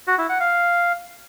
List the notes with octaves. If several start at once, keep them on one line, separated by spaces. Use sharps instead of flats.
F#4
E4
F#5
F5